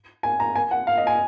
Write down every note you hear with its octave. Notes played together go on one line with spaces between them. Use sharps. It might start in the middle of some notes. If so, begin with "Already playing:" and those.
G#5
A#5
G#5
F#5
F5
D#5
G#5